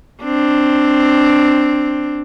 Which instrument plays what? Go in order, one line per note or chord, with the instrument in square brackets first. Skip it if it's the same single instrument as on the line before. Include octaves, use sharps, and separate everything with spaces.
[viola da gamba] C4 D4